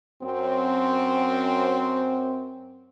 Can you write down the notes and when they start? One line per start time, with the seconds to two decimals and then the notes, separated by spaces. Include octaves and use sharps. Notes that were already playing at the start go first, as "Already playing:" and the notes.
0.23 F#2 C4